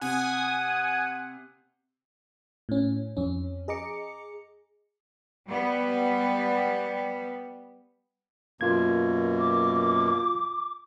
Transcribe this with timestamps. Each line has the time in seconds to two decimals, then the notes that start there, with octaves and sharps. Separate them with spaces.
0.01 C3 F#5 G#5 D#6
2.69 A2 C#4
3.17 F2 C#4
3.68 G#4 D#5 A#5 D6 C#7
5.47 G3 B3
8.61 F#2 B2 A#3 F4 G#6
9.39 D6